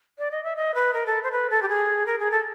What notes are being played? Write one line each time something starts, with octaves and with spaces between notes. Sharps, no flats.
D5
D#5
E5
D#5
B4
A#4
A4
C5
B4
A4
G4
G#4
A#4
G#4
A4